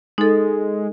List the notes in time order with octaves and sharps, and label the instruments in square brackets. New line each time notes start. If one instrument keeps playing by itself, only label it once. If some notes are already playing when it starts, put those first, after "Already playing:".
[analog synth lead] G#3 [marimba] D#4 A4